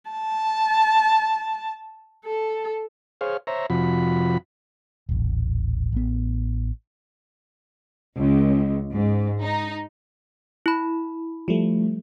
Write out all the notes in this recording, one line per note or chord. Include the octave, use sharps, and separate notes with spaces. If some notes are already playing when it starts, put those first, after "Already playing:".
A5
A4
G#4 C5 C#5 F5
C5 C#5 E5 A#5
F2 C3 F3 F#4 B5
D#1 A1
A1 B3
C#2
G#2
D#4
E4 B5
F3 G3 A3